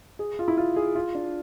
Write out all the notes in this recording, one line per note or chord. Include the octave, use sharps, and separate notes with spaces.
G#4
F4
E4
F4
G#4
F4
D4